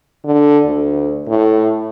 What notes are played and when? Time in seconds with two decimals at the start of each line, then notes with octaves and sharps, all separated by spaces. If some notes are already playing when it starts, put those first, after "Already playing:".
0.24 D3
0.65 D2
1.29 A2